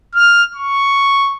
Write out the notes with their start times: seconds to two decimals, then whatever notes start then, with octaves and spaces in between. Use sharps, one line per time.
0.15 F6
0.55 C#6